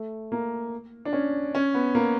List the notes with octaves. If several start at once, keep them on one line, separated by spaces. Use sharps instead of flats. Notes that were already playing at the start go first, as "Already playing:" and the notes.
Already playing: A3
A#3
D4
C#4
C#4
B3
A#3